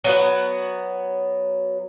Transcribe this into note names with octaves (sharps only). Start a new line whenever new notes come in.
F#3 B3 F#4